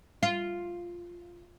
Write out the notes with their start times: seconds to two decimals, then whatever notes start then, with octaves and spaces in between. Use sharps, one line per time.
0.23 F4